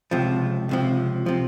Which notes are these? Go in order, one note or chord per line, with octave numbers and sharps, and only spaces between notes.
C#2 C3 F3
C#2 C3 F3
C3 F3